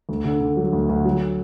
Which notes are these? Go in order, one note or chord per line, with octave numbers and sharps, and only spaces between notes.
D2
D3
D3
F#3
D2
D2
F#3